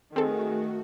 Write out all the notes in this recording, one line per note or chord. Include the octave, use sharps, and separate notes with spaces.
D#3 A3 C4 F#4 G#4 A4